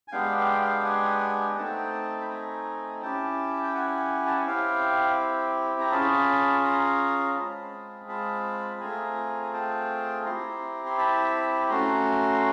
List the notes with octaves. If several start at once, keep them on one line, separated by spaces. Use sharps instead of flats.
G#5
G#3 B3 D4 G4 F5 G5
F#5
F5 G5
F5 G5
F#5 G#5
A#5
A3 C4 D#4 G5 A5
B5
G#5 A#5
C#4 E4 G4 G5 A5
G5
F#5 G#5
A5
G#5
C4 E4 G4 F5 G5
A#5
C#4 F4 G#4 A5 B5
A#5 C6
A#5
G#3 C4 F4 G#4 A5 B5
A5 B5
B5
A3 C4 F4 G#4 G#5 A#5
G#5
G5 A5
C4 E4 G4 A#5 C6
C6
A5 B5
A3 C#4 F#4 A#5 C6